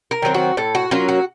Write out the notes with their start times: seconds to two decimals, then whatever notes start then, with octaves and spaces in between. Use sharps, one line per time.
0.11 A#4
0.22 D#3 F#3 C4
0.34 F#4
0.57 A2 A4
0.75 F#4
0.91 F#3 A#3 C#4 F4
1.09 F#4